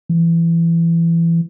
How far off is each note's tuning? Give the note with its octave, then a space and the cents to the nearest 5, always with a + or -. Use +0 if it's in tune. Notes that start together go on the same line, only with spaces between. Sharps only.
E3 +20